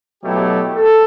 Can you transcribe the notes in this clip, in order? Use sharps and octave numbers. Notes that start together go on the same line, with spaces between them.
B2 F#3 A3 E4 G4
A4